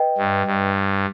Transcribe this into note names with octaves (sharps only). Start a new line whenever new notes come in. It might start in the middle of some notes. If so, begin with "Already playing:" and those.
Already playing: B4 D#5 G5
G2
G2